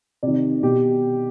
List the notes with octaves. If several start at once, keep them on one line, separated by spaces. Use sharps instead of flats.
C3 D#3 D5
B2 G4